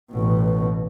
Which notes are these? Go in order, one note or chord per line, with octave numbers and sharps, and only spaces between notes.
A1 B2